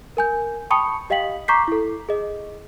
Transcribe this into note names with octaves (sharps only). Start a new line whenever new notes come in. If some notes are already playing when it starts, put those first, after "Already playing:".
A#4 G#5 G6
G5 A5 B5 C#6 D#6 C#7
G4 D#5 F5 G5 B6 F#7
A#5 C#6 D6 G6 B6 C7
E4 A4
G#4 D#5